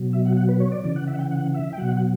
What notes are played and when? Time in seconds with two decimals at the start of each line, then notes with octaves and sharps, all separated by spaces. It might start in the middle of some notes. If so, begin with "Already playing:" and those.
Already playing: B2 F#3
0.13 E5
0.25 F#5
0.37 F#5
0.49 B4
0.60 C#5
0.72 D5
0.84 C#3 E3 D5
0.96 F#5
1.08 E5
1.14 F#5
1.19 G5
1.31 F#5
1.54 E5
1.73 G5
1.78 B2 F#3 F#5
1.97 F#5